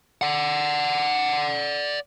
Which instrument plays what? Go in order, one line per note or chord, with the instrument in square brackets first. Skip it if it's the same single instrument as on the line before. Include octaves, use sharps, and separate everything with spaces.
[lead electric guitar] D5 F#5